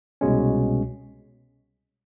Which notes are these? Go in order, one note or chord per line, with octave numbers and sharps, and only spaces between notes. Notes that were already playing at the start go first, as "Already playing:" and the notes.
C2 B2 G#3 C#4